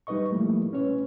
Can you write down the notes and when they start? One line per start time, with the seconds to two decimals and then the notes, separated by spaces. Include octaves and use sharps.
0.07 G3 D#4 B4 D#5 C#6
0.31 F3 G3 A3 A#3 E4
0.73 C#4 B4 C#5